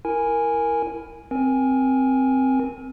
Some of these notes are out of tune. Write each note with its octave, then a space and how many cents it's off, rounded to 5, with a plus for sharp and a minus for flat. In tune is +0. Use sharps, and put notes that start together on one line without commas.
E4 +0 A#4 +0 G#5 -5
C4 +0 A#4 +25 G#5 +0